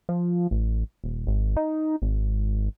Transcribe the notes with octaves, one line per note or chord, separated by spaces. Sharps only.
F3
A1
D#1
G#1
D#4
G#1